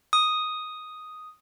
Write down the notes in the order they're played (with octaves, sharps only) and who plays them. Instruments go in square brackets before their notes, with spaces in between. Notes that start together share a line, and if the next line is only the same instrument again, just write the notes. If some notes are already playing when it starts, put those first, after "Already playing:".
[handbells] D#6